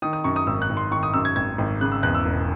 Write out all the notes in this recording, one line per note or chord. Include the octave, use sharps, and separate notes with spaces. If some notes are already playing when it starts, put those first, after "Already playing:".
D#3 D#6
D#6
F#2 C#6
D#6
G#1 E6
F#6
G#1
C6
D#3 C#6
D#6
F#2 E6
G#6
G#1 G#6
G#1
C#3 F#6
E6
E2 F#6
E6
E1